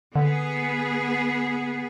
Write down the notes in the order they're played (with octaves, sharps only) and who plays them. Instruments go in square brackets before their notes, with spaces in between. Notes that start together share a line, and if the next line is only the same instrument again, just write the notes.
[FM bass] D3 [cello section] B3 G#4